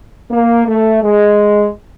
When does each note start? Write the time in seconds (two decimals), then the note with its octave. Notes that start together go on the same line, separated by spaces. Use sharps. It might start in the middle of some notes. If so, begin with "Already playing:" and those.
0.31 A#3
0.66 A3
1.03 G#3